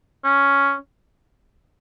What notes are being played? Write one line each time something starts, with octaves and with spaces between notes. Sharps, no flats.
C#4